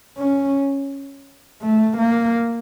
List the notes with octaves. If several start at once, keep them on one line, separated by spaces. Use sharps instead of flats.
C#4
A3
A#3